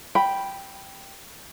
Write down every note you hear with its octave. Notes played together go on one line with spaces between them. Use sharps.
G5 B5